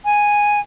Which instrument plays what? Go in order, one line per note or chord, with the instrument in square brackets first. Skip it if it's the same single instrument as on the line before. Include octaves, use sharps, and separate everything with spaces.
[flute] G#5